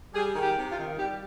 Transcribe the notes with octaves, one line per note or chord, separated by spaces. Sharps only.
G3 G#4
D#3
G4
C3
F4
D#3
G3 G4